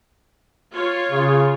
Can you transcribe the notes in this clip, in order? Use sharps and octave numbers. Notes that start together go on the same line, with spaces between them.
F4 C#5
C#3